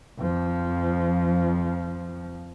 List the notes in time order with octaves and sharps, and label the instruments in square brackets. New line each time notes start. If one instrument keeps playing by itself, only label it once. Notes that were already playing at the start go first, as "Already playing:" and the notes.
[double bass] F2 F3